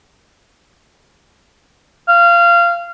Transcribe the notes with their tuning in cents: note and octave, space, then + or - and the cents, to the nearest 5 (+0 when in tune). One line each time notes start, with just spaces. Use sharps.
F5 -20